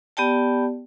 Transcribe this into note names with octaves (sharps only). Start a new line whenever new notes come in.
B3 G4 D5 G5 A5